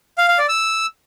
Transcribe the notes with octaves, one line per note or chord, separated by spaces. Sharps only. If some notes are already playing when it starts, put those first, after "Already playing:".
F5
F5
D5
E6